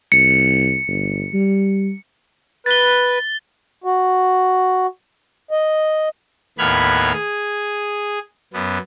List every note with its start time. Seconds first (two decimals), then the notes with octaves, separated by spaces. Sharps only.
0.12 C2 C#7
0.88 G1
1.33 G3
2.66 B4 A6 G7
3.84 F#4
5.51 D#5
6.58 D#2 A2 B3 B5 F6 G#6
7.13 G#4
8.53 F#2 B3